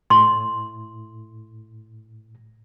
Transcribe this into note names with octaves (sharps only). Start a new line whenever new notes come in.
A2 C6